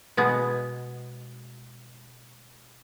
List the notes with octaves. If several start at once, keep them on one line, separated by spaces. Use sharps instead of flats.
B2 G#3 B3